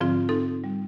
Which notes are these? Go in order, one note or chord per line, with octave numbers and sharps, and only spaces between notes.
G#2 D3 F3 C4 F4
C4 D#4 A4
G3